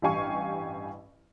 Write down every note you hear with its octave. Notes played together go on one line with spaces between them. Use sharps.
A1 G2 G4 F5 G#5 C#6